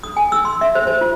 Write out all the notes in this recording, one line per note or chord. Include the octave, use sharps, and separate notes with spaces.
D#6
G#5
E6
C6
E5
C5
C5
F4